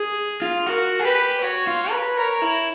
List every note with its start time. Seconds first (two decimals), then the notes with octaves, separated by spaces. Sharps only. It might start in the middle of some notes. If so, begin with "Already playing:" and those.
Already playing: G#4
0.42 F4
0.67 F#4 A#4
1.00 G#4
1.05 G4 B4
1.42 F#4 C#5
1.67 F4
1.91 B4
2.17 A#4 C#5
2.42 E4